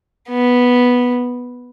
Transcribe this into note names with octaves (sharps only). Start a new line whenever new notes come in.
B3